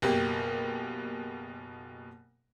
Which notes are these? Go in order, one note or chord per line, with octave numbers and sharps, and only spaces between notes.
F#1 B2 A#3 G4